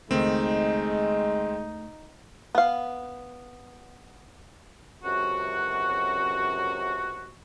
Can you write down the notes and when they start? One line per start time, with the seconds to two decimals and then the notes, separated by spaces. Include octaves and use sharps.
0.11 C#2 D#3 G#3 A3 C4 D#4
2.55 B3 F5
5.04 C#2 F#2 C3 F#4